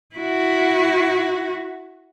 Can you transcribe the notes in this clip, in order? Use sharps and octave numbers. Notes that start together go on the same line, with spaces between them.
E4 F#4